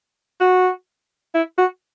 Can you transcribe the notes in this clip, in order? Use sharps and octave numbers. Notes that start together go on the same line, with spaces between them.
F#4
E4
F#4